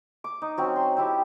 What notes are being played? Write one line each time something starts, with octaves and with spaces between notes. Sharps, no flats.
D6
D#4
F#3 C4 C#4
C6
C4 E4 G4